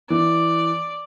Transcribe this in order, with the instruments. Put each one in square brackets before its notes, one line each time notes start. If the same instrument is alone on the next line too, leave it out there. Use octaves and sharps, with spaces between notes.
[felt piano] E3 [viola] D5